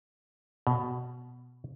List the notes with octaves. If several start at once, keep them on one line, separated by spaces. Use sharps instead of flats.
B2